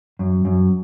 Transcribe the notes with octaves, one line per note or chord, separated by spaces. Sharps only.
F#2
F#2